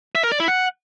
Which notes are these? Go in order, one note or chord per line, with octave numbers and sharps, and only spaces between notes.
E5
A#4
D5
E4
F#5